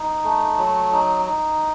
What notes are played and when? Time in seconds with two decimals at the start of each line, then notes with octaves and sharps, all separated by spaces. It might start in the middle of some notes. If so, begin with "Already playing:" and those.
Already playing: D#4
0.24 A3
0.58 F#3
0.92 D#4
1.26 D#4